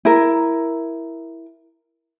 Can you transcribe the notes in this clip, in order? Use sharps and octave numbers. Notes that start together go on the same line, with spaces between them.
E4 A#4